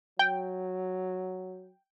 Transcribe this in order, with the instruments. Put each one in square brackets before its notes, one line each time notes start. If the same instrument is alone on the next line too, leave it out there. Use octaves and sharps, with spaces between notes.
[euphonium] F#3 [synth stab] G5